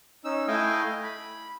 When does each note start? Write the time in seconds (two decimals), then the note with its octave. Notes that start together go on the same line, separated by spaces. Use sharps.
0.25 C#4 D#4 E6
0.48 A3 E4 D#5 F5 G5 G#5
1.03 B5